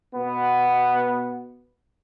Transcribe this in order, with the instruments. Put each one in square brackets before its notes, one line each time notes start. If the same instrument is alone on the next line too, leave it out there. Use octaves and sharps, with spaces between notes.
[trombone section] B2 B3